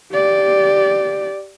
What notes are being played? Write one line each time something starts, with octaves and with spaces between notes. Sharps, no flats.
G4 D5